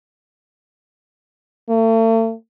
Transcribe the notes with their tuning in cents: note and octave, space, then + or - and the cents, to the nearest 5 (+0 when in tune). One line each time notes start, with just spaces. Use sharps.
A3 +40